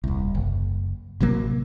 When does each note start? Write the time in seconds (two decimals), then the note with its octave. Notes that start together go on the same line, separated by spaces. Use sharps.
0.04 D#1 C2
0.35 F#1
1.20 A1 C3 F#3 A#3